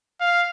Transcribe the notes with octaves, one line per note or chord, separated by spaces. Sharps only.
F5